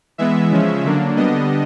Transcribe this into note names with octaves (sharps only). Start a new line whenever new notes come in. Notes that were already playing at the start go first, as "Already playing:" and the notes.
E3 G#3 B3 E5
C#3 F3 G#3 C#4
D3 F#3 A#3 D4
D3 G3 B3 D4 D#5